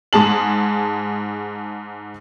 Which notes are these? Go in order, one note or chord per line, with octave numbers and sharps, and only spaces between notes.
G#2 G#4 A5 F#7